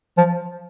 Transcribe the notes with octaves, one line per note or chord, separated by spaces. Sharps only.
F3